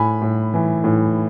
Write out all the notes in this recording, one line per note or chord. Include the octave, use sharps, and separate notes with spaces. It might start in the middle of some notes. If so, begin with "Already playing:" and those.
Already playing: A2 G#5 B5
A2
E3
A2